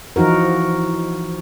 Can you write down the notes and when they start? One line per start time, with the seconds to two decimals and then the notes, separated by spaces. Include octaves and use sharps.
0.16 E3 F3 D#4 F#4 A#4